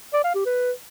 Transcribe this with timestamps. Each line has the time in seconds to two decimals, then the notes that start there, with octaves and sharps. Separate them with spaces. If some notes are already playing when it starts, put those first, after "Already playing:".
0.14 D5
0.24 F5
0.35 G4
0.46 B4